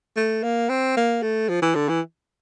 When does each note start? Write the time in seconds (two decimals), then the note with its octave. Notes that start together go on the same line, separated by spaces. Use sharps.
0.16 A3
0.43 A#3
0.69 C4
0.96 A#3
1.22 A3
1.49 F3
1.62 E3
1.75 D3
1.89 E3